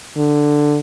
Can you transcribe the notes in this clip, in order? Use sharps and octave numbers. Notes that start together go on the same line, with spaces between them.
D3